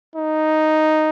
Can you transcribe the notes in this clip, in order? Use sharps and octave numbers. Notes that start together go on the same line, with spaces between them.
D#4